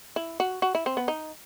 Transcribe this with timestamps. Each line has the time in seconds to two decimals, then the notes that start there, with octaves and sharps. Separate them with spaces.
0.16 E4
0.40 F#4
0.62 F#4
0.75 E4
0.86 C4
0.97 B3
1.08 D#4